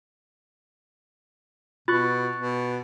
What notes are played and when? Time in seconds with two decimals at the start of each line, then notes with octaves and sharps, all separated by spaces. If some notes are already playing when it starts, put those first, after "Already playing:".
1.88 B2 F4 C#6 F#6 A6
2.36 B2